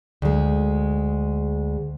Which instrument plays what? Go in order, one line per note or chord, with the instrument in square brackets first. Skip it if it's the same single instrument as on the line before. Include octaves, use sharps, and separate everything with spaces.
[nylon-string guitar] D2 G#3